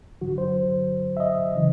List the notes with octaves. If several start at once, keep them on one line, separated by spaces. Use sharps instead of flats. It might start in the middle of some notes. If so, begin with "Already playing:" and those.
G2 D3 F#3 F#4
C5
E5
D#5
C#3 E3